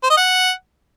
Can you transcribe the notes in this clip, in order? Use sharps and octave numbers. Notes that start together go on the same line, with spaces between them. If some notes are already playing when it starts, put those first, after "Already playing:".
C5
D#5
F#5